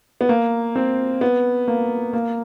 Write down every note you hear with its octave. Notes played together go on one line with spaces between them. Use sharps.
B3
A#3
C4
B3
A#3
A#3